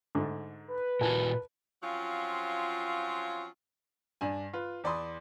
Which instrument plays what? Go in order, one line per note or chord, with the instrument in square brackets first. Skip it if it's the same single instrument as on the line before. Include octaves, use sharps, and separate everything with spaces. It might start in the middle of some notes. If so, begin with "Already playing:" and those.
[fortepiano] G#2 D3 A3
[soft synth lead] B4
[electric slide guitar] A#2 E4 F#4 [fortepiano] A#4 G#5 A5
[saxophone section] F3 F#3 C4 C#4 F4
[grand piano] G2 D4 G#5
F4 B4
E2 D5 B5 C6 D#6